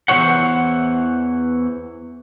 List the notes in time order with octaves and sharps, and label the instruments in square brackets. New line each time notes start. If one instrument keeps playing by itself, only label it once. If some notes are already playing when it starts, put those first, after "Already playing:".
[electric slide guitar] E2 E3 G3 C5 C#5 F#5